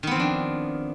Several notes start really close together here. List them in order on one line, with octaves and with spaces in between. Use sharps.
D#3 B3 C4 F3 D4